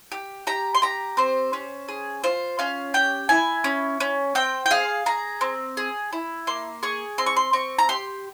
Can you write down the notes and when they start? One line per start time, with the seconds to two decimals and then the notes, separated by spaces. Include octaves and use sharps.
0.12 G4
0.47 G4 A#5
0.75 C6
0.82 G4 A#5
1.17 C4 C5
1.53 C#4
1.88 G#4
2.24 F4 C5
2.59 C#4 F5
2.94 G4 G5
3.29 E4 G#5
3.64 C#4
4.00 C#4
4.35 C4 G5
4.66 G5
4.71 G#4 F5
5.06 G#4 A#5
5.41 C4
5.77 G#4
6.13 E4
6.47 A#3 C6
6.83 G#4 C#6
7.18 C4 C6
7.26 C#6
7.36 C6
7.53 C4 C#6
7.79 A#5
7.89 G4 C6